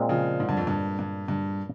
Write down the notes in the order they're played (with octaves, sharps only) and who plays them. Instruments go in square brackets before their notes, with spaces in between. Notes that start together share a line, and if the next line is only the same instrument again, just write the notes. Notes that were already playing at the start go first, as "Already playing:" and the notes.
Already playing: [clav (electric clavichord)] A#2 G#3 C4 F4
[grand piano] C#3 F3
G#2
G2
F2
G2
G2
G2